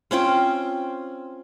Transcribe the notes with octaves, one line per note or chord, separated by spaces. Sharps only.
C4 C#4 F4 G5